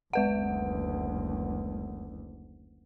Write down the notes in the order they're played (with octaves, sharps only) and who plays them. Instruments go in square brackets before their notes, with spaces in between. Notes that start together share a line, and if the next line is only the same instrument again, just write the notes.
[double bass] F#1 D2 [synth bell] G#3 B4 F#5